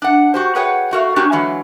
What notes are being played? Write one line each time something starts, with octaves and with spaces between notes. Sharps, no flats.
D4 F#5
F#4 G4 C5
F#4 G#4 B4 C#5 F#5 G5
A3 F#4 A#4 F5
A#3 C#4 D4 F#4 G4
D3 E3 F#3 G#3 A#3